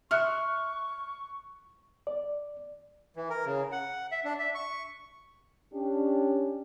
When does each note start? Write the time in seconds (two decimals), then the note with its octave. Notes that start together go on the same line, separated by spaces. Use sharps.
0.11 E5 C6 C#6 F6 F#6 C#7
2.07 D5
3.16 E3
3.30 A#4
3.46 C#3
3.72 F#5
4.12 E5
4.24 D4
4.39 E5
4.55 C#6
5.73 C#4 D4 G4